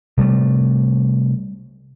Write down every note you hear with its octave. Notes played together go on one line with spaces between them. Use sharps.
C3 G3 A3